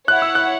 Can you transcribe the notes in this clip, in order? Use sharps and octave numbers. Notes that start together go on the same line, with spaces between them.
E4 C#5 F#5 F#6
E6
F#6